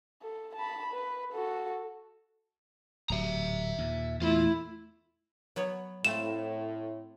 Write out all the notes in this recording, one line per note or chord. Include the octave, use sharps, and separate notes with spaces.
A4
A5 B5
B4
F#4 A4
D1 F#3 E5 A#5
D#2 A#2
E2 A#2 A3 E4 F4
F#3 B3 C#5
A2 A3 C4 F5 E7